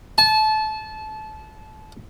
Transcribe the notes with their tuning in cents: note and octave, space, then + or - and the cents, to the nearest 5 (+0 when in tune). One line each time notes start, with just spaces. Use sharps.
A5 -25